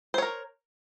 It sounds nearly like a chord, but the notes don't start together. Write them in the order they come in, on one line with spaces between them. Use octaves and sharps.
C5 C#5 A#4